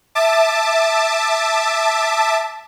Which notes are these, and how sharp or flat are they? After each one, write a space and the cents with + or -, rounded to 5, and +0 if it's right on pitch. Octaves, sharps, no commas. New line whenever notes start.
E5 +0 A5 +0 D6 +30